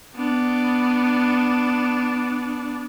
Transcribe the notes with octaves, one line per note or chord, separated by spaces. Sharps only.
B3 D4